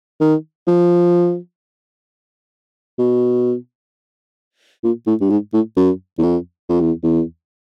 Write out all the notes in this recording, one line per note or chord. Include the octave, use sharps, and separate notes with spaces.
D#3
F3
B2
A#2
A2
G2
G#2
A2
F#2
E2
F2
F2
E2
E2